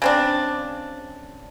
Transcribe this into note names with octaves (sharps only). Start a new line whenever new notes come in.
C#3 C4 D4